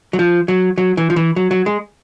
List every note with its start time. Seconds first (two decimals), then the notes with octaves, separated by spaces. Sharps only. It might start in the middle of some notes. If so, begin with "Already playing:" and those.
0.13 F#3
0.19 F3
0.48 F#3
0.78 F#3
0.97 E3
1.10 F3
1.16 E3
1.36 F#3
1.51 F#3
1.66 G#3